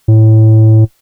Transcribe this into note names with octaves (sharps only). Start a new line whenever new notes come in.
A2